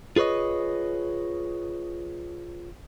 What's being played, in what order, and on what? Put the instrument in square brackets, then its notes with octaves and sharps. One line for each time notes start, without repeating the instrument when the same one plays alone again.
[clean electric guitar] F4 G#4 B4 C#5 D#5